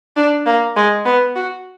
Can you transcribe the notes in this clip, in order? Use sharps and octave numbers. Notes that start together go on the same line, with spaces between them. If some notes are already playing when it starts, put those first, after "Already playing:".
D4
A#3
G#3
B3
F#4